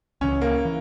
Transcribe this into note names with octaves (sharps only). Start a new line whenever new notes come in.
C#2 C#3 E3 C#4
A#3
E3